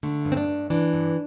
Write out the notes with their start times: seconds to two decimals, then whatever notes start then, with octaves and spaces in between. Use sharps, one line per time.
0.03 D3 A3
0.25 G2
0.32 C4
0.37 D4
0.48 G2
0.70 E3 D4
0.93 G2